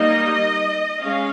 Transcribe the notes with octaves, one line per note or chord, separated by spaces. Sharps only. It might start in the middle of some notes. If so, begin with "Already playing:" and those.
Already playing: G3 A#3 D#4 D#5
G#3 C#4 F5